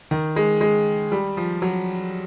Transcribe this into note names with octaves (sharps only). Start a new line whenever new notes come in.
D#3
G#3
G#3
G3
F3
F#3